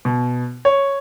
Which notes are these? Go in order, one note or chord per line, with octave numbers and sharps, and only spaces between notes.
B2
C#5